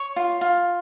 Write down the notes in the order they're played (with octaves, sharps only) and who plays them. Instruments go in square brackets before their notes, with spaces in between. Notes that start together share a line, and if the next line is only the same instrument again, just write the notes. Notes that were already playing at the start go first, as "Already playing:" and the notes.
Already playing: [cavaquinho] C#5
F4
F4